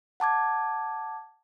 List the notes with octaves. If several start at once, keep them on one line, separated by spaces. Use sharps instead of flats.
F#5 A5 D6 G#6